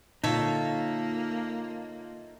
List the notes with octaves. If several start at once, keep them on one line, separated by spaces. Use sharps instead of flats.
A#2 D3 A#3 D#4 F4 A4 C#5 E5